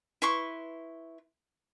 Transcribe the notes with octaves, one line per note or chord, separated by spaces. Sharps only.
E4 B4 C6 C#6